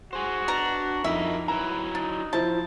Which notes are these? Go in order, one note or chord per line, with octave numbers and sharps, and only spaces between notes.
F#4 G#4 C5
B2 D4 A#5
F2 D#4 E4 A#4 E5
F#3 E4 B4 A#5
D4 D#4
F3 E4 C5 A5